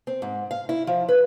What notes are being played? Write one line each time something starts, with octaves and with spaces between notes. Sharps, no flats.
C4
G#2
F5
E4
F3
B4